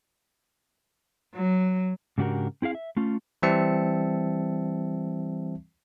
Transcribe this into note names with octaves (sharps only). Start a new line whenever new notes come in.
F#3
G#2 C#3 D4 F#4 G4 A#4
C4 E4 G#4 F5
E5
A3 C#4 F4
E3 G3 C4 E5 A5 C#7